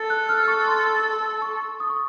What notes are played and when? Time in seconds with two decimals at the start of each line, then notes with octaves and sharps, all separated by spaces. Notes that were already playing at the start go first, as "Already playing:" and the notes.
Already playing: A4 A6
0.10 F#6
0.29 F6
0.48 C#6
0.67 C6
1.42 C#6
1.80 D#6
1.90 C#6